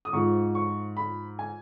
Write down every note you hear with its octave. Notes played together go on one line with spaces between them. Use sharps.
D#6
G#2 F3 C#6
C#6
B5
G#5